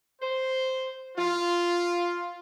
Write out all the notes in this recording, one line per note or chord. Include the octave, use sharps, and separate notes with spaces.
C5
F4